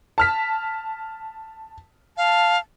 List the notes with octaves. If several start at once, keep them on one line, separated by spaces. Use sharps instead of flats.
A5 F6 B6
F5 A5